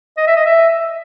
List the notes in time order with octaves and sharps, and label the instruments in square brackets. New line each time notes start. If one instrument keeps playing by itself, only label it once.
[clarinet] D#5
E5
D#5
E5